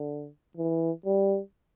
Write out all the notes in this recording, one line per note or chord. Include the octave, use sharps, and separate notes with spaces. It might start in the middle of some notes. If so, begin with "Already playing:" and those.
Already playing: D3
E3
G3